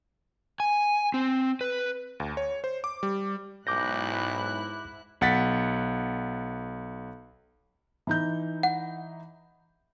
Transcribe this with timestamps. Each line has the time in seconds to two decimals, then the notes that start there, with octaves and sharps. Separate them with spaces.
0.60 G#5
1.14 C4
1.61 B4
2.20 D2
2.37 C#5
2.64 C5
2.84 D6
3.03 G3
3.67 B1 G#2 E4 D6 F#6 G6 A#6
5.21 B1 F#5 A6 B6
8.07 E3 D#4 G6
8.63 F#5